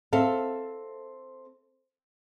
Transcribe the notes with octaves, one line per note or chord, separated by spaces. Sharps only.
C4 A4 E5 F5